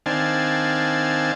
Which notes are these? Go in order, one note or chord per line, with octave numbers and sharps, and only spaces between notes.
D#3 C4 D4 F5 G#5 A5